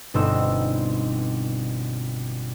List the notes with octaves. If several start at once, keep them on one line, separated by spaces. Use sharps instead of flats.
G1 B2 B3 C4 D#4 E6